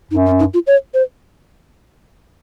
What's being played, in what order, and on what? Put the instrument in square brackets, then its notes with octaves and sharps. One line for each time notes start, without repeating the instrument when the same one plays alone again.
[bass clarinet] F#2 [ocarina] D#4
[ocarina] C#4
D#4
F4
C#5
C5